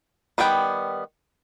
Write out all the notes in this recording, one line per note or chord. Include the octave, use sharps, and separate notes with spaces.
D#3 G3 B3 G5